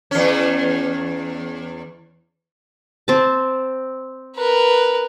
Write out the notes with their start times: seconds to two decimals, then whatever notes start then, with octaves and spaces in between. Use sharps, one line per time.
0.11 E2 C#4
3.08 C4 A5
4.36 A#4 B4